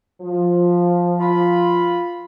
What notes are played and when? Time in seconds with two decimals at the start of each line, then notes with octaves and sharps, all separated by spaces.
0.21 F3
1.19 F4 B5